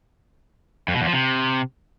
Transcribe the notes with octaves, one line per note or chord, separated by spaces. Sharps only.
F2
B2
E2
F3
C3